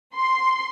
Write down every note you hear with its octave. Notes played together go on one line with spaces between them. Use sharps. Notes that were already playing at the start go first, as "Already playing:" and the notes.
C6